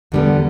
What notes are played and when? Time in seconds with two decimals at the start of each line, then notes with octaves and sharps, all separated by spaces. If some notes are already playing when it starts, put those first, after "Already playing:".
0.12 E2 D3 G3 B3